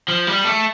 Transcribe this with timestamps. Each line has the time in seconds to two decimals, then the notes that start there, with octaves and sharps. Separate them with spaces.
0.08 F3
0.27 G3
0.45 A3